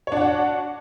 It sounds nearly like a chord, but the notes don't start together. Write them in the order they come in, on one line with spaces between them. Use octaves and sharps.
C#5 D4 F#5 F#4